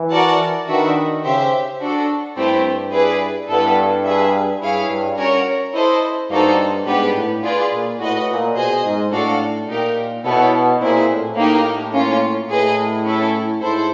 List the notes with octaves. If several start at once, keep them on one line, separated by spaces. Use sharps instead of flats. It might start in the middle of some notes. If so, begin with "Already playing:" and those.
Already playing: E3
F#4 A#4 D5 F#5 A5
D#3 D4 F#4 B4 E5
C#3 G4 C5 E5
D4 F#4 A4
G2 A3 C4 E4 G4 C5
E4 G#4 B4 D5
G2 B3 E4 A4
G#4 B4 E5
G2 E4 G#4 C#5 F5
G2
C#4 F#4 A#4 C#5
E4 A4 C5 D#5
G2 A#3 D#4 F#4 A4 C5
G#2 B3 D4 G4 B4
A2
F4 G#4 B4 D5
A#2
A2 F#4 B4 D#5
A#2
B2 G#4 C5 D#5 G#5
G#2
A2 D4 F#4 A4 D5 F5
A#2 D#4 G4 A#4
B2 B3 E4 A4 C#5
A#2 C4 E4 G#4
A2
A#3 D#4 G4 A#4
A#3 C#4 F4
A2 G#4 B4 D#5
C#4 E4 A4
G#2 E4 A4 C5